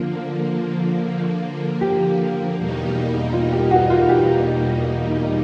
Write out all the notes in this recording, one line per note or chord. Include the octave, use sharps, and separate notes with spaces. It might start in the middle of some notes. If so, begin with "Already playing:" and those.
Already playing: D3 F3 A#3 F4
G4
E2 B2 G3 A#3 D#4
F4
G4
F#4
F4
G4